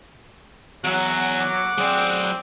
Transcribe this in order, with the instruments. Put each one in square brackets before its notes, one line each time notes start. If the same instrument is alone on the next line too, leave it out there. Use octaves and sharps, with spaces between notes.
[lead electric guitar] E2 [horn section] F#3 [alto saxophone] F#5
[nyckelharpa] D6
[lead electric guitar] F#3 D5 [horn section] C4 G#4